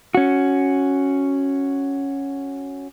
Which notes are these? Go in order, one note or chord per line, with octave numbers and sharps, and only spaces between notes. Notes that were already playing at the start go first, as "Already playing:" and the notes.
C#4 F#4